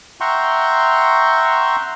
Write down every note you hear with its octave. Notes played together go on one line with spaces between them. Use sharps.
E5 F#5 G5 A#5 C6 C#6